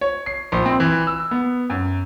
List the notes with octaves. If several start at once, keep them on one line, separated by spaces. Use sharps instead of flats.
C#5
C7
A#1
C4
E3
E6
B3
F#2